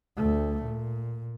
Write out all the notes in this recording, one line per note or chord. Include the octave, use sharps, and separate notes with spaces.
D2 A3
A#2